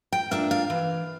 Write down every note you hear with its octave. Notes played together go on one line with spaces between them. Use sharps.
G5
A#3 D4 F4 E5
F5
E3